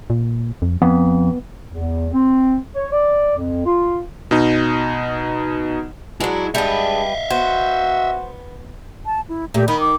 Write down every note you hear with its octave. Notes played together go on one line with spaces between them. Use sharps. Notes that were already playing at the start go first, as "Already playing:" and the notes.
A#2
F2
F2 B3
E2
C4
C#5
D5
F2
F4
B2 D#4
F#3 G#3 D4 E4 F#4
G3 G#3 D4 B4 D#5 E5
B3 F#4 C5
A5
E4
A#2 A3 G4
D#3 B5
D6